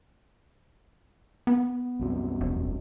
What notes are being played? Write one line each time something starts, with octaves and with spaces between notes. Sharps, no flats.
B3
C2 F#2
E1